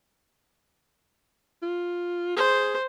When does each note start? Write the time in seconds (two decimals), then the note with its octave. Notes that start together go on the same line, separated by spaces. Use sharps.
1.62 F4
2.37 G#4 C5